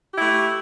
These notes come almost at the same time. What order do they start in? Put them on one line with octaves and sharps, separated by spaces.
G4 E4 A3